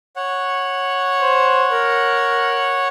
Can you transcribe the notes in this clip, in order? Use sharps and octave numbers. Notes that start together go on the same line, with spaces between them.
C#5 F#5
C5
A#4